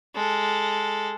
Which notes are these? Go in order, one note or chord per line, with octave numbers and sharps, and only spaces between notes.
G#3 A4